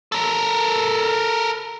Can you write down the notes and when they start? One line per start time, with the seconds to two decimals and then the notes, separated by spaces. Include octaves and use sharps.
0.12 A4 A#4